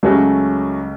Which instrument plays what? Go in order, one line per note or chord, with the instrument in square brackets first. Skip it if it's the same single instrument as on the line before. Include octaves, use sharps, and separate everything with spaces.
[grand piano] C#2 C#3 [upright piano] F#3 A3 C#4 F#4